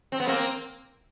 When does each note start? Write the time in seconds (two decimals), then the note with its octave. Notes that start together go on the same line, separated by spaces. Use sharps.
0.12 C4
0.20 B3
0.27 A#3 C4